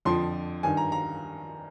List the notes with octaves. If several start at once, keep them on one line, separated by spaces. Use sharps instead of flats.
F2 D3 F3 C6
G2 D#3 G#5
A#5
A#5